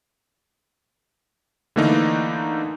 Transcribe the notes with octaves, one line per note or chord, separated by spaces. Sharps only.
D3 E3 A3 A#3 D4 D#4